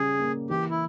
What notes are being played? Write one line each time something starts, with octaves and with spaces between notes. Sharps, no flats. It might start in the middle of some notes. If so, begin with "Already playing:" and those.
Already playing: C#3 G3 G#4
A#3
E3 G4
E4